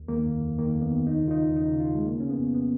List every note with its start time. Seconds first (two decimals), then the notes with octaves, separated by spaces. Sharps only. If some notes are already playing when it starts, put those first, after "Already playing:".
Already playing: D#2
0.08 D#3 A#3
0.25 F2
0.41 F2
0.58 D#3 A#3
0.74 F2
0.82 B3
0.91 D#3
1.06 D#2 D#4
1.23 C#3
1.28 F4
1.31 D#4
1.40 D#2
1.56 C#3 D#4
1.72 C#3
1.80 F4
1.89 C#3
1.95 G#3
2.05 C#3 A#3
2.20 C#3 C#4
2.30 B3
2.38 F2
2.54 B3